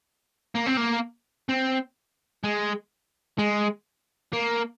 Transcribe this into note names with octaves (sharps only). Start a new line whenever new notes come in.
A#3
C4
A#3
C4
G#3
G#3
A#3